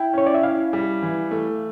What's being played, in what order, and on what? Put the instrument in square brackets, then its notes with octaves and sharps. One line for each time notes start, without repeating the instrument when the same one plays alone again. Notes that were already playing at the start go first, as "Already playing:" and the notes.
Already playing: [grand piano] E4 [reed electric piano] G5
[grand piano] C#4 [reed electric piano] C#5
[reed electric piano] D5
E5
[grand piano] E4 [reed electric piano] F5
[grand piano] G3
E3
A3